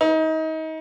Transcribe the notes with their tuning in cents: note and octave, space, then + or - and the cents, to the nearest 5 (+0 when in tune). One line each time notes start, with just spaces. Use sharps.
D#4 +30